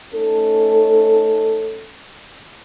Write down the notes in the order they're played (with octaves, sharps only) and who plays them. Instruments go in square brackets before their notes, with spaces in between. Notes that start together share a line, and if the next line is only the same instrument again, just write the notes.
[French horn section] A3 C#4 D#4 A4